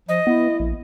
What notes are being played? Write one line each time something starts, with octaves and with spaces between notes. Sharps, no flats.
F3 D#5
B3 E4
A#1